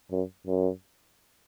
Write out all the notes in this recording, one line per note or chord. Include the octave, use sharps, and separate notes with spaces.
F#2
F#2